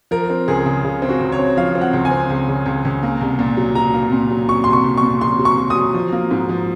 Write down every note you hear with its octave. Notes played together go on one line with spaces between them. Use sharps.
F3 A#4
C4
C#2 G#4
C#3
C#3
C4
F#4
C#2
C#5
C4
F3 F5
C4
F#5
C#2
G#5
C4
C#2
C#3
C#2
C#2
A#3
C2
A#2
F#3
F#3 A#5
A#3
A#2
F#3
F#3 C#6
C2 C6
C#6
C2
C#6
A#2
F#3 C6
F#3
C#6
F#3
D#6
F#3
F3
A#3
G#2
F3